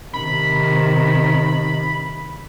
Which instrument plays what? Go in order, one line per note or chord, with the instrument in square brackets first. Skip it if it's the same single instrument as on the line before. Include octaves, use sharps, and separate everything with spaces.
[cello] C3 D#3 [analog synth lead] B5